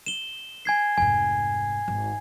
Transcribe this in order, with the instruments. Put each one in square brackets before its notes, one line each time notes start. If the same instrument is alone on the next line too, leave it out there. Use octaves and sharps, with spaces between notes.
[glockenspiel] E7 G7
G#5 G#6 C7
[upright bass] F1 G#2 [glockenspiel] G#5
[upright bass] G#1